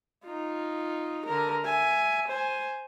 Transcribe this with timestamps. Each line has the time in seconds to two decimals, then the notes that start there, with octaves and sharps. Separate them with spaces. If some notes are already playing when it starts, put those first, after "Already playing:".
0.24 D#4 F4
1.25 D3 A#4
1.64 E5 G#5
2.28 C5 G#5